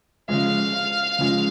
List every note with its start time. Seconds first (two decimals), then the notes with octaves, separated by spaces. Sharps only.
0.29 C#3 F3 G#3 F5
1.19 C#3 F3 G#3